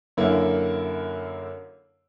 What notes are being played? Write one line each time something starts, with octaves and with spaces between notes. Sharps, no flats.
F#2 D3 A#3 E4